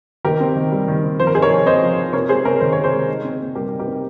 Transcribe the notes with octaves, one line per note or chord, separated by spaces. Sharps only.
D#3 G4 A#4
C4
D#3
G3
D#3
C4
F3 C5
A#4
D#4 G#4 C5
A#4 C#5
F3
C4 C5 D#5
F3
D#4
C3 A#4 C#5
G#3 G#4 C5
C3 A#4 C#5
D#3 C5
C3 C#5
G#4 C5
G#3
D#4
C4
A#2
G3 G4 A#4
D#4
G4 A#4
C4